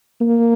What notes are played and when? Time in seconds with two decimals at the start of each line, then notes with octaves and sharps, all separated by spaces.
0.21 A#3